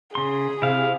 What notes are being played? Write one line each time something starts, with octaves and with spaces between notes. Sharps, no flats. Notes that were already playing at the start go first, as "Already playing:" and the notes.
C#3 G#4 C6
C3 E4 F5